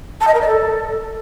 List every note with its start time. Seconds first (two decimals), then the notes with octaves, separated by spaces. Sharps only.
0.21 A5
0.27 D#5
0.34 A#4
0.41 D5
0.48 A4